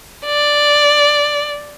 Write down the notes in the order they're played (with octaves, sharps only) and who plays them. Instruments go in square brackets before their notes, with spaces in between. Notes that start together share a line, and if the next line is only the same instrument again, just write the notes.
[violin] D5